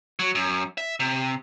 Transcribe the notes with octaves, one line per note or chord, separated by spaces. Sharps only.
F#3
F#2
E5
C3